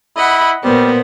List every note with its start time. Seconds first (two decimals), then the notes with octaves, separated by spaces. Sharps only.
0.16 E4 D#5 F#5 B5
0.64 A#2 G3 B3 A#4 C5